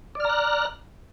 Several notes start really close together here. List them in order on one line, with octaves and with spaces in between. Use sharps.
D5 F6 A#5 F#6